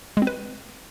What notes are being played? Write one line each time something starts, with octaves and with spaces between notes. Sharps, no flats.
G#3
C4
B4